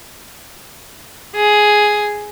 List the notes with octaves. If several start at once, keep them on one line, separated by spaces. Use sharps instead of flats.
G#4